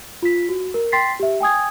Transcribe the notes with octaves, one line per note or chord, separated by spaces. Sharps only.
F4 B6
F#4
A#4
G5 C6 A6 B6 C7
G4 E5
G5 G#5 D#6 G#6